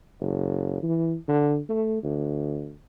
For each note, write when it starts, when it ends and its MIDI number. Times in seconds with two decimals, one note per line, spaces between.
0.21 0.81 30
0.83 1.15 52
1.28 1.58 50
1.69 2.01 57
2.03 2.72 38